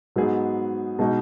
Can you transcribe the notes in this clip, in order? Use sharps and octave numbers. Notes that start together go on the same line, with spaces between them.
G#2 F#3 B3 D#4 G#4
B2 G#3 D#4